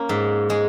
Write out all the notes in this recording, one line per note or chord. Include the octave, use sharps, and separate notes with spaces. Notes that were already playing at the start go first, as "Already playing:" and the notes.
Already playing: A#3 C#4
G#2
G#3